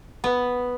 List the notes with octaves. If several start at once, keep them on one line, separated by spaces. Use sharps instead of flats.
B3